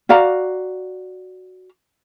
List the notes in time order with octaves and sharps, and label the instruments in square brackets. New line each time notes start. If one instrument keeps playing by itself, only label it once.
[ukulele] F#4 D5 F5 A#5